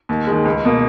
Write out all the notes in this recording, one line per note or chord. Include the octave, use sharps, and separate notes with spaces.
D#2
D#3 G#3
C#2
B2 A#3